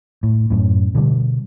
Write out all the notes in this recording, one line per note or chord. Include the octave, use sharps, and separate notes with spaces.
A2
F#2 A2
B2 D3 G3